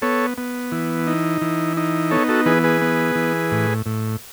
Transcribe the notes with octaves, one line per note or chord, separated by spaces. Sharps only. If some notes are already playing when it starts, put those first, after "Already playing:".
B3 A4 C#5
B3
E3
D#4
E3
D#4
B3 A4 C#5
F#4 A4
E3 G#4 B4
G#4 B4
B3
E3
A2
A2